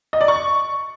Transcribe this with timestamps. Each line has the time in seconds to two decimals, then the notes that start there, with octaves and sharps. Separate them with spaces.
0.13 D#5
0.21 D5
0.28 C#6